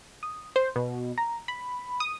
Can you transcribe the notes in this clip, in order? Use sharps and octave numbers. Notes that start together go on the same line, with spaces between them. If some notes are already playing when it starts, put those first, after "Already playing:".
D#6
C5
B2
A#5
B5
D#6